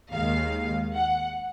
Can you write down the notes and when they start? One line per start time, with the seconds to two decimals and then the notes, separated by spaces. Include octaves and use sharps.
0.11 D#2 D#3 G#3 F5
0.93 F#5